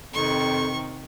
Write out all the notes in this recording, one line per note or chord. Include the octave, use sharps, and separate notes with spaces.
F2 C3 D#3 C#6